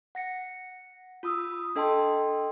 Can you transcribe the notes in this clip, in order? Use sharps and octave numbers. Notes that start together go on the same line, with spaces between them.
F#5 A#6 C#7
F4 B5 D#6 E6
D4 A4 D#5 G5 A5 C6